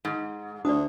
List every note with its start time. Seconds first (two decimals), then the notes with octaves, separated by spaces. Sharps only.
0.05 G#2
0.65 D2 D4 D5 D#6